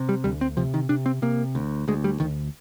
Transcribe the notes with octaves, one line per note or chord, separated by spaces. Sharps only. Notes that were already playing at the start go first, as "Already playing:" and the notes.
Already playing: C3
G3
D2 G3
C4
C3 F3
D#3
C3 D4
C4
C3 A#3
D2
D2 G#3
G3
D2 D#3